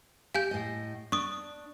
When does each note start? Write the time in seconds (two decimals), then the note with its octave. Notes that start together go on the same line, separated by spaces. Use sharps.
0.35 G4 F5 G#5 G6
0.51 A2 D#5
1.12 D4 C#6 D#6